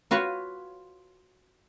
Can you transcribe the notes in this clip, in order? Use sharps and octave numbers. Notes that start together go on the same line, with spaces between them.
F4 F#4 B4 C#5